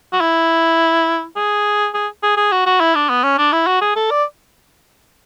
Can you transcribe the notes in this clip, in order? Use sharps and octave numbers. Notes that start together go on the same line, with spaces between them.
F#4
E4
G#4
G#4
G#4
G#4
F#4
F#4
E4
D4
B3
C#4
D4
E4
F#4
G#4
A4
D5